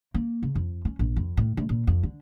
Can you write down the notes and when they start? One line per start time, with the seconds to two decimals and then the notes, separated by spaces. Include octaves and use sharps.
0.14 A#3
0.43 C#3
0.55 F2
0.85 C#4
0.99 A#1
1.16 F2
1.37 A2
1.57 D2
1.69 A#2
1.87 F2
2.03 D3